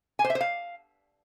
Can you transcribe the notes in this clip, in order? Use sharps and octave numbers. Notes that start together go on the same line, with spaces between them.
G#5
C5
E5
C5
F5